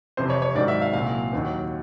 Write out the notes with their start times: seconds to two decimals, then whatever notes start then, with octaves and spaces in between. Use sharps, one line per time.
0.17 F2 C3 E3 C5
0.30 C#5
0.42 C#5
0.55 G#2 D#3 F#3 D5
0.68 E5
0.82 F5
0.93 C2 A#2 F#3 F5
1.32 D#2 D#3 F#3